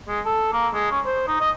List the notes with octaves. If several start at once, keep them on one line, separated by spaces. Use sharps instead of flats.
G#3
A4
A#3
G#3
C#4
C5
D#4
D#5